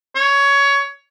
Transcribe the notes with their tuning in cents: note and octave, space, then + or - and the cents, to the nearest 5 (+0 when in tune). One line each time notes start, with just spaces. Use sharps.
C#5 +15